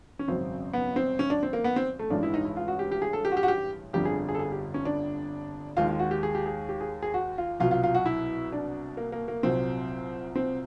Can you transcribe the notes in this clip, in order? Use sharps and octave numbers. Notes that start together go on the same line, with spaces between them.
C#4
G#1 F#2 C#3 F#3 C4
B3
C4
C#4
D4
C4
A#3
B3
C4
A3
A1 G2 E3 G#3 D4
E4
D#4
E4
F4
F#4
G4
G4
G#4
A4
G4
F#4
G4
F#4
G4
G1 F2 D3 G3 G4
G#4
G#4
A4
G#4
G4
C#4
D4
D#2 D#3 G#3 F4
F4
F#4
G4
G#4
G4
G#4
G4
G#4
G#4
F#4
F4
C2 B2 F#3 F4
F4
F4
F#4
E4
D4
A#3
A#3
A#3
C2 A#2 F#3 C4
C4